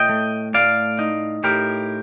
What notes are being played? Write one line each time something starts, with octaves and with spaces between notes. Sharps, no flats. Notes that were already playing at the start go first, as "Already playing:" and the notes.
Already playing: A2 D#5 G5
A3
A2 D5 F5
D#4
A2 G4 A#4